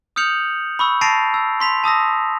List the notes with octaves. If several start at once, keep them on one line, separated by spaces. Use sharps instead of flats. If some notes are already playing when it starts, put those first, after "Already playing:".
D#6 F6 G6 C#7 F7 F#7
B5 C#6 E6
A5 A6 A#6 C7 D7 F7
E6
C6 B6 F7
A5 D#6 E6 A#6